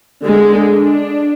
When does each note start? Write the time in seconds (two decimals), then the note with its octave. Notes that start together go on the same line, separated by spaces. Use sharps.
0.22 D3 G#3
0.71 D4